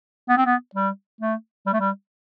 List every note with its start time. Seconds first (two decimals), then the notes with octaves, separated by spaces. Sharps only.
0.29 B3
0.37 C4
0.46 B3
0.75 G3
1.20 A3
1.66 G3
1.73 A3
1.80 G3